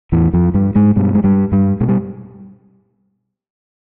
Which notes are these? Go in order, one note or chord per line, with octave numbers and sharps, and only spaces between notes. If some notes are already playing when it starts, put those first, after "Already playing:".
E2 A2 E3
F2 F3
G2 G3
G#2 G#3
G2 B2 G3
G#3
G2 G3
G2 G3
B2 G#3
G3